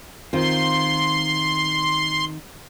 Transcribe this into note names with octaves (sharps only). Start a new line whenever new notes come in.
D#3 C4 F4 C6